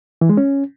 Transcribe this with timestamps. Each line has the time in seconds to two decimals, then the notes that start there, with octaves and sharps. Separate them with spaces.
0.21 E3
0.29 G#3
0.37 C#4